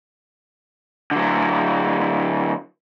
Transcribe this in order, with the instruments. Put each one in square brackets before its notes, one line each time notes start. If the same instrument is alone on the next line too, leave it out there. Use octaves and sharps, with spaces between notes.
[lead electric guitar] D3 F#3